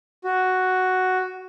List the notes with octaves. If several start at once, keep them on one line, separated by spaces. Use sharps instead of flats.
F#4